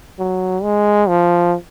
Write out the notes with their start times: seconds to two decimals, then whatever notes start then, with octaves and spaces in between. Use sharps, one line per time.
0.19 F#3
0.63 G#3
1.08 F3